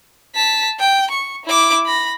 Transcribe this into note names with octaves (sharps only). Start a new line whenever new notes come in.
A5 B6
G5
C#6
E4 D6
B5 A#6